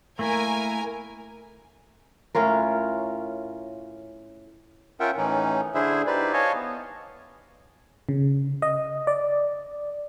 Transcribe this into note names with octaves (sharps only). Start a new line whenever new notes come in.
A3 A#3 E4 A#4 G#5
A2 C#4 F4 A#4
C#4 F4 A#4 E5 F#5 G5
A2 E3 C#4 D#4
D3 D4 E4 G#4 C5 E5
D#4 E4 G4 B4 C5 D5
C#5 D#5 F5 G#5 A5 C#6
B3
C#3
D#5
D5